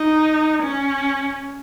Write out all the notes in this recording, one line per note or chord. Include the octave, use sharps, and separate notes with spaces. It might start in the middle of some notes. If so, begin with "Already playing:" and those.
Already playing: D#4
C#4